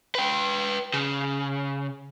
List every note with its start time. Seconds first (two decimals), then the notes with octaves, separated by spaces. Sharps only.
0.15 B4 G5
0.94 C#3